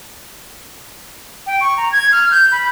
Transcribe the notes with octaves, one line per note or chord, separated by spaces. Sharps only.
G5
C#6
A#5
G#6
F6
G6
B5